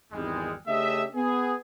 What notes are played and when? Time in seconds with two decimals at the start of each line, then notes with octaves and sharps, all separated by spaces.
0.12 G#1 E2 G3 G#3
0.67 C#3 A3 D4 G4 D#5 E5
1.15 B3 G#4